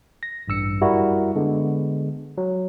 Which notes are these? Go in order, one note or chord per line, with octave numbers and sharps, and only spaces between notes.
A#6
A1 G2 E6 C#7
F#2 G3 E4 F#4 A#4
D3 G#3 B3
F#3